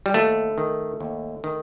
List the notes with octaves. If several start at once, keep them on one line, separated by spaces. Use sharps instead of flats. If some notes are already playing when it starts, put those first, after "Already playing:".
G3
D#2 A3
D#3
D#2
D#3